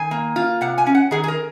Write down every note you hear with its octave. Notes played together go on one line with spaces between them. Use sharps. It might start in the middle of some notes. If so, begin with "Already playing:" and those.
Already playing: D#3 G#5
A#3
F4
C3 F#5
G#5
C#4
F#5
D#3 G#4
G#4
A#4